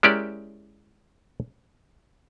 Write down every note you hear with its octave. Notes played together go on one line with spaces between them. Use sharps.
G#3 C#4 E4 G4 A#4 D5